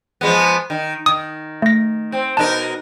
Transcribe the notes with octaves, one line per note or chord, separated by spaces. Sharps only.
F3 G#3 B3
D#3
D#3 D#6
A3 A#6
C4
B2 D#4 A#4 A5